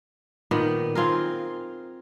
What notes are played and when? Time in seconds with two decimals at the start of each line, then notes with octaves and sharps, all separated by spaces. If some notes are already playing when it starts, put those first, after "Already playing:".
0.51 A#2 D#3 B3
0.95 C4 F4 G#4 A#4